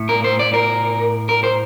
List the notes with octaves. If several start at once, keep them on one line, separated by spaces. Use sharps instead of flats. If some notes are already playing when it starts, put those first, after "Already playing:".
Already playing: A2 A3
A#4
C5
D5
A#4
A#4
C5